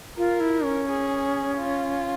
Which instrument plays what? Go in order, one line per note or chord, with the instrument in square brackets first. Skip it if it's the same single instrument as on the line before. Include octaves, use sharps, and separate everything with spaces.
[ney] F4 [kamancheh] A#4
[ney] E4
C#4
[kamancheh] G#4
F4